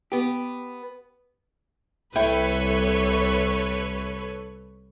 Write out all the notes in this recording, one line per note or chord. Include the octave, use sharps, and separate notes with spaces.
B3 G4
C2 E4 A4 B4 C#5 G5